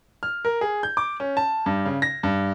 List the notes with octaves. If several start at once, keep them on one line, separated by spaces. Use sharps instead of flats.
F6
A#4
G#4
G6
D6
C#4
A5
G2
C#3
A#6
G2